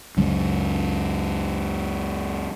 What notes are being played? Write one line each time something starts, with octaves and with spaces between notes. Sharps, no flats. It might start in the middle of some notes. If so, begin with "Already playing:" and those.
C#2 F#2